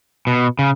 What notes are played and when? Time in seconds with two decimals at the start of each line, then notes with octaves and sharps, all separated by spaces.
0.27 B2
0.59 C#3